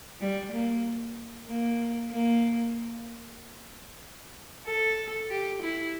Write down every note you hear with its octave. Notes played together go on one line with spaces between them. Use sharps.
G3
A#3
A#3
A#3
A4
G4
E4